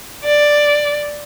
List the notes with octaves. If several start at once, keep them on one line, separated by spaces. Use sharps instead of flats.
D5